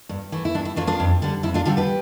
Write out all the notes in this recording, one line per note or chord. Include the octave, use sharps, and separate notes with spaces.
G2
E3 A3
E4
G2 D4
E4
E3 A3 D4 F4
D4 F4
F2
D3 G3 D4
F2 E4
D4 F4
D3 G3 D4 F4 A4
G4 B4